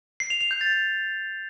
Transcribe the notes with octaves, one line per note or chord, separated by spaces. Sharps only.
C7
F7
F7
G6
A6